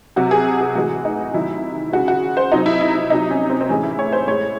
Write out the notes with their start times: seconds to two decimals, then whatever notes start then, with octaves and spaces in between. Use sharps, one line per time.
0.16 C3 F#3 F#4
0.31 G#4
0.61 G#4
0.75 A2 E3 G#3 F#4
1.05 D#4
1.34 C3 D#3 F#3 E4
1.93 C#3 G#3 F#4
2.08 F#4
2.37 C5
2.52 C3 F#3 D#4
2.66 E4
2.81 E4
2.95 E4
3.10 C3 F#3 D#4
3.30 C#4
3.50 C4
3.61 C4
3.69 A2 E3 G#3 C#4
3.83 E4
3.99 C#5
4.13 C5
4.27 A2 G#3 C#5